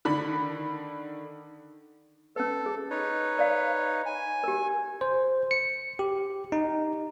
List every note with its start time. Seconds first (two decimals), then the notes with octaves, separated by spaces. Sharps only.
0.05 D3 D#3 B5
2.36 C#4 A4 B4
2.66 G#4
2.90 D#4 B4 C#5
3.37 A#4 D5 F5
4.06 G#5
4.44 G4 A#4
5.01 C5
5.51 C#7
5.99 G4
6.52 D#4